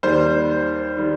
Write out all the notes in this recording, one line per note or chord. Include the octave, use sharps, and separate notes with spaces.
D#2 D#3 G3 C5
D#3 G3